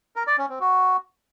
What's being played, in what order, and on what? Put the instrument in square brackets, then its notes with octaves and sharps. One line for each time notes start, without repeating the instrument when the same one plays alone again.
[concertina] A#4
D5
C#4
C4
F#4